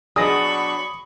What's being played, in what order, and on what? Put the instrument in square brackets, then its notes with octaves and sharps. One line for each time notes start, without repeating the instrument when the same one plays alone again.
[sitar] B2 F#3 D4 [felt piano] G#4 A#6 [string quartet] B5 C#6 [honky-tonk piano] D#6